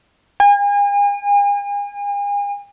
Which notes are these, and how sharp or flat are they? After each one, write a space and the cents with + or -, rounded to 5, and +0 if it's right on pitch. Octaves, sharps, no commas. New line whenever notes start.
G#5 -40